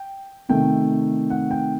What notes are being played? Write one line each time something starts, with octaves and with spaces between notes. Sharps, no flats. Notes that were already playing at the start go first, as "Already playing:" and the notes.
Already playing: G5
C3 D#3 A3 G5
F#5
G5